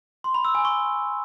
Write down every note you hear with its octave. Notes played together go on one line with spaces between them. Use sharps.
C6
B5
E6
G#5
C#6